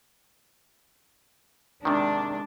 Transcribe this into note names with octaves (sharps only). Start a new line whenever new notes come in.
C3 D#3 G#3 D4